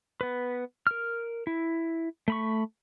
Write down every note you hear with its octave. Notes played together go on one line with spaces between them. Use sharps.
B3 B4
A#4 F6
E4
A3 B5 C#6